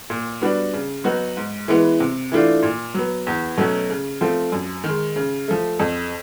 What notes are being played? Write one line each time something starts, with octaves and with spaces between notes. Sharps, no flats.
A#2
G3 B3 D4 F#4
C#3
F#3 B3 D#4 F#4
G#2
E3 G#3 B3
C3
E3 A3 D4 F4
A#2
F#3 B3
E2
B2 F#3 A3 C#4
C#3
F3 A3 C4 F4
F#2
D#3 G#3
C#3
F3 A3
F2